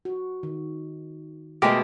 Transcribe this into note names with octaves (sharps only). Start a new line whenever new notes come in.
F#4
D#3
B2 G#3 A3 G4 A#4 D#5 A5